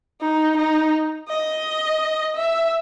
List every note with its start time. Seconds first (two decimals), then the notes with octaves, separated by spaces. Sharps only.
0.21 D#4
0.57 D#4
1.29 D#5
2.36 E5